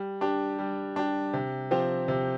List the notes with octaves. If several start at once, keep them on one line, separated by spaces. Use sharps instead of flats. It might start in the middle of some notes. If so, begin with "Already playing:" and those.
Already playing: G3
D4 G4
G3
D4 G4
C3
F3 C4 G4
C3